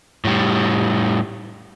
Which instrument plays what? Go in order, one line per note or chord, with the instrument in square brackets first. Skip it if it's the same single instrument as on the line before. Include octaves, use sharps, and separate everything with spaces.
[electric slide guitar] A2 G3